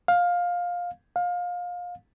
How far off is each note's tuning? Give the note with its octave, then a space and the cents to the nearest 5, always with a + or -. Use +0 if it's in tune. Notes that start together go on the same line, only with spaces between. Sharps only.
F5 +15
F5 +25